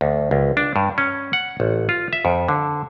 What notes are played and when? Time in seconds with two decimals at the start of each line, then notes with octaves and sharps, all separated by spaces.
0.01 D2
0.31 C#2
0.57 D4
0.76 G2
0.98 C#4
1.33 F#5
1.60 A1
1.89 F4
2.13 E5
2.25 F2
2.48 D3